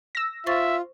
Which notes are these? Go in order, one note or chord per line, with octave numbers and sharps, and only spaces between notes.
E6 A#6
F4 C5 E5 C#6 A6